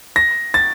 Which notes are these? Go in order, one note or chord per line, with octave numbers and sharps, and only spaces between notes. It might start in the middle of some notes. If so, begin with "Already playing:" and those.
A#6
A6